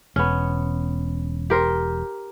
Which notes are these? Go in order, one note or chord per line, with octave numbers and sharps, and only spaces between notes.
E1 B3 C#4
G4 A#4 C5